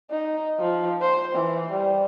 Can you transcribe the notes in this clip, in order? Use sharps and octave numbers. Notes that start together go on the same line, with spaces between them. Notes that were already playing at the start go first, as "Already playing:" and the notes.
D#4
F3
C5
E3
G3